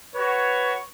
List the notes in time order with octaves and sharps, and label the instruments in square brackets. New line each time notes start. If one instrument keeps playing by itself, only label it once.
[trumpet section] F#4 C#5 [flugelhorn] B4